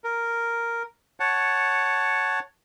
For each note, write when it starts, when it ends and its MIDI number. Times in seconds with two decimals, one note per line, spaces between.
0.04 0.83 70
1.20 2.39 73
1.20 2.39 78
1.20 2.39 81